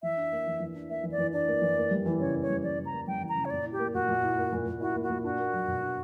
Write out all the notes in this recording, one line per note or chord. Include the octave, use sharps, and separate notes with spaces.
E3 E5
D4
A#3
E3
E3
D4
A#3 E5
E3
D5
E3
D4 D5
A#3
E3
A#3
G3
E3
C#3 C#5
A#3
C#5
G3
E3 D5
C#3
A#5
A#3
G3 G5
E3
A#5
C#3
C#5
A#2 D5
E4
G4
A#3
A#2 F#4
A#2
E4
A#3
A#2
A#2
E4 F#4
A#3
F#4
A#2
D4 F#4
A#3
F#3
B2
D4